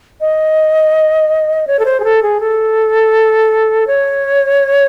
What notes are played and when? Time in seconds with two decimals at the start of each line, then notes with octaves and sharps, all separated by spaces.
0.21 D#5
1.67 C#5
1.79 A4
1.85 C5
2.00 G#4
2.04 A4
2.23 G#4
2.40 A4
3.87 C#5